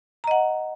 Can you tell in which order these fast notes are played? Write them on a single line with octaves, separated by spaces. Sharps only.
A#5 D#5 F#5